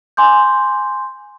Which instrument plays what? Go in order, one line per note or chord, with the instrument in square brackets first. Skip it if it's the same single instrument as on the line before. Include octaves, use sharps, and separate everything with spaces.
[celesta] G#5 C6 D6 G6